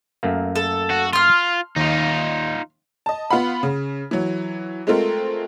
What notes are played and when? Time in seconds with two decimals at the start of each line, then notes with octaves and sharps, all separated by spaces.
0.23 F#2 A3 A#3
0.56 A4
0.90 F#4
1.13 F4 C6 F6
1.76 D#2 D#4 F4
3.06 D#5 A5
3.31 B3 F4 F5 F#5 B5
3.63 C#3
4.11 E3 F#3
4.87 G#3 A3 C4 F4 A#4